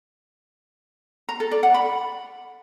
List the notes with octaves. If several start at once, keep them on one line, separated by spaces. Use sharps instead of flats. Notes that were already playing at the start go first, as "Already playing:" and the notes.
A#5
A4
D5
F#5
B5